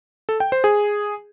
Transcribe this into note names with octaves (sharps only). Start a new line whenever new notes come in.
A4
G5
C5
G#4